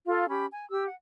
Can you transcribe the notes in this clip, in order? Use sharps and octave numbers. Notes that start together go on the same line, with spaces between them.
F4 A4 F5
C#4 G4 B5
G#5
G4 E6
F#5